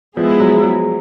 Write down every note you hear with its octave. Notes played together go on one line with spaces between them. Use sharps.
F3 G#3 B3 E4 G#4
F#3
F#3